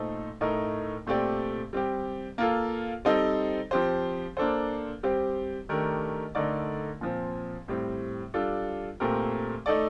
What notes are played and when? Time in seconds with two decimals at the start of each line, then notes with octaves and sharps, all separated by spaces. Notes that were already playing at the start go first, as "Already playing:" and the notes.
Already playing: A#2 A3 D#4 A4 C5
0.41 A2 A3 D#4 A#4
1.06 A#2 A3 C4 G4 D5
1.73 G3 C4 G4
2.38 A#3 F4 A4
3.05 G3 C4 D#4 A4 C5
3.71 F3 C4 G4 C5
4.37 A#3 D4 A4 C5
5.03 G3 C4 G4 C5
5.69 D#3 A3 D4 G4 A#4
6.35 D3 A3 D#4 A#4 D5
7.01 A#2 F3 C4
7.68 A2 G3 C4
8.34 G3 D4 F4 A4
9.00 A#2 A3 C4 G4 A#4
9.66 A3 D#4 A4 D5